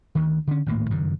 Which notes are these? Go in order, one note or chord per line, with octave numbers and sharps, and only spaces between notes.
D2 D#3
D3 C#4
G#1 D2 A2 A#3
F#1 G2 D#3